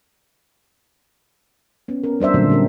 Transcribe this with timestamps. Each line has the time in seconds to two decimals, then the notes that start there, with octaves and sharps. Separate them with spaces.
1.88 B3 C#4
2.04 C#4 A#4
2.20 G3 D4 C5 E5
2.34 A#2 D3 F#3 A3 A#3 C4
2.50 G3 G#3 C#4 G4 A#4